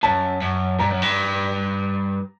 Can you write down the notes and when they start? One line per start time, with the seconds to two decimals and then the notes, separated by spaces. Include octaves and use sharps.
0.03 F#2 A5
0.41 F#2
0.79 G2 A#5
0.90 F#2
1.02 G2